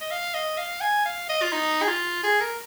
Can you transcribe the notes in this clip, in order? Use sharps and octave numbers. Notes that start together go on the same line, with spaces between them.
D#5
F5
D#5
F5
G#5
F5
D#5
F4
D#4
G#4
F4
G#4
A#4